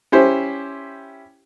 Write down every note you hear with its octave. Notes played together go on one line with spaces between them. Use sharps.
C#4 E4 G4 C5